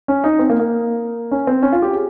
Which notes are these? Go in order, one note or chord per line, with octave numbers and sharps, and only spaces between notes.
C#4
D#4
C4
A#3
A#3
C#4
C4
C#4
F4
G4
G#4